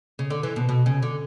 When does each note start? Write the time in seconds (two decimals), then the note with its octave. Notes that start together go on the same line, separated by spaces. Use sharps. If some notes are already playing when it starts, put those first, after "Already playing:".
0.19 C#3
0.30 D3
0.43 E3
0.56 B2
0.69 B2
0.86 C#3
1.03 D3